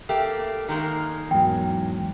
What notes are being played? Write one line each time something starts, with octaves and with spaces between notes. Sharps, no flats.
A3 A#3 G4
D#3 G#3 A#3
E2 G#2 F#3 G5